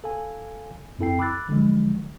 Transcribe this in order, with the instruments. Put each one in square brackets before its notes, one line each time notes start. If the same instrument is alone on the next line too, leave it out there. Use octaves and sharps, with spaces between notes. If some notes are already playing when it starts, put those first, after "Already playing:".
[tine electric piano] A4 F5 G#5
F#2 C4 E4 A4 G5 C7
B5 D6 E6 F#6 A6
D3 F3 F#3 G#3